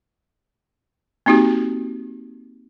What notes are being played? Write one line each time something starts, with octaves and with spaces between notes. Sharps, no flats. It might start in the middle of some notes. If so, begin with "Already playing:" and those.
A#3 C4 D#4 F#4 G4